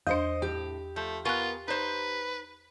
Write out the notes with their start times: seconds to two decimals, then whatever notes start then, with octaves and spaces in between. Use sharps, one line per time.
0.07 E2 D4 C5 D#5
0.42 A2 G4
0.96 F3 A3 G6
1.25 B3 F4 A#4 G#5 C#6 F#6
1.68 D#4 B4 C5